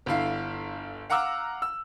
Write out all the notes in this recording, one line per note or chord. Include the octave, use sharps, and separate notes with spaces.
G1 D3 E4 F5 C7
F5 F#5 A#5 D6 E6 F6
E6